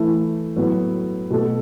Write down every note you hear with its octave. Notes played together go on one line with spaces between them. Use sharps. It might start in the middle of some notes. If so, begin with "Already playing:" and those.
Already playing: E3 A3 E4
A2 F#3 B3
B2 A3 F#4 A4